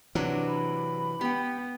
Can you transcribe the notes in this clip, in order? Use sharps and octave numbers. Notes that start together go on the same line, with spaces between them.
C3 E3 F#3 D4
B5
B3 G4 G5